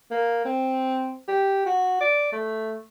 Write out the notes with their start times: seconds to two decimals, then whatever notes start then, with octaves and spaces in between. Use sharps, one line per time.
0.11 A#3
0.45 C4
1.28 G4
1.66 F#4
2.01 D5
2.32 A3